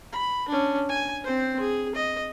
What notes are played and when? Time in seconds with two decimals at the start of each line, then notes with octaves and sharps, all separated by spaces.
0.13 B5
0.49 C#4 D4
0.89 G#5
1.24 C4 C5
1.60 G#4
1.95 D#5